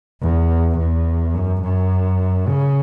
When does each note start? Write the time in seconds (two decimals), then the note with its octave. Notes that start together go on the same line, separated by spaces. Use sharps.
0.22 E2
0.78 E2
1.34 F#2
1.63 F#2
2.48 C#3